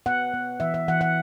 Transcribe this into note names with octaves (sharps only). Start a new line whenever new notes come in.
B3 F#5
B3
E3 E5
E5
E3 F#5
F#5